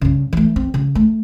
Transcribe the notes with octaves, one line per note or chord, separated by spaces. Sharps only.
G2 C#3
E3 A3
C4
C#3
A3